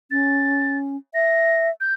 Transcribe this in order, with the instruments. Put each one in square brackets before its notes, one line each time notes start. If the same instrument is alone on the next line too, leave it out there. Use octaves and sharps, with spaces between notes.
[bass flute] C#4 [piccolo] A6
[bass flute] E5 [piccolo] A#6
[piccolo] G6